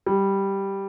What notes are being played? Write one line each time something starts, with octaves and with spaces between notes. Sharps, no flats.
G3